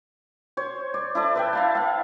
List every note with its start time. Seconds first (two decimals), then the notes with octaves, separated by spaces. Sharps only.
0.57 C5 C#5
0.94 D5
1.15 E4 A4 D5
1.35 B4 E5 G5
1.53 E4 F5 A5
1.75 E5 F5